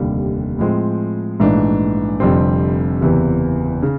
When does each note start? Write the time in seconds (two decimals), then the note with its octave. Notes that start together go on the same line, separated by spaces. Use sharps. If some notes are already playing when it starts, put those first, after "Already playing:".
Already playing: F1 D#2 D3 G3
0.59 A2 F3 G#3 C4
1.39 A#1 G#2 E3 A3 D4
2.20 F1 F2 D3 G3 C4
3.01 F#1 E2 C3 E3
3.83 C#3